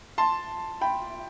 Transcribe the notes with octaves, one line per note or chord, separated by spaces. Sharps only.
A5 C6
G5 B5